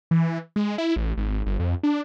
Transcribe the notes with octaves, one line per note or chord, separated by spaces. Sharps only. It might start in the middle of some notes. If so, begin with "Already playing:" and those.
E3
G#3
E4
A1
G#1
G1
F2
D4